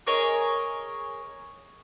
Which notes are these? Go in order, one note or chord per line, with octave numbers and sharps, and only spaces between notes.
G#4 A#4 C#5 D#5